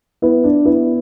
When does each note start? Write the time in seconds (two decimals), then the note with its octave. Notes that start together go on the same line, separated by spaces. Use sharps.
0.22 B3 E4
0.44 D4
0.65 B3 E4